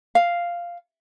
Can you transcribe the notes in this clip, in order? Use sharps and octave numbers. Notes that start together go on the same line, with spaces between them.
F5